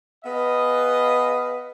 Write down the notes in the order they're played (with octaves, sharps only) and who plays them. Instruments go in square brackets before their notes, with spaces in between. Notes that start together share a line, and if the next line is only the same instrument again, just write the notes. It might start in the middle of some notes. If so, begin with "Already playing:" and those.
[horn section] B3 G#4 B4 D#5 F5